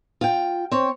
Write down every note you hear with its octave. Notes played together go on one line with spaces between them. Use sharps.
F4 G5
C4 C#5